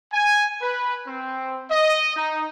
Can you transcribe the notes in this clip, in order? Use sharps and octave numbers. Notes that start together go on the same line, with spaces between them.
G#5
B4
C4
D#5
D#4